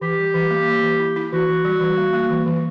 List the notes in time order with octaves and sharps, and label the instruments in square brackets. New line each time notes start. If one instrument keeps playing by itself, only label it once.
[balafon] E3 [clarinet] G4
[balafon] G3
E3
A#3
A#3
E3
E4
E4
[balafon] E3 [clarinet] F#4
[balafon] E3
G3
E3
A#3
A#3
E3
E3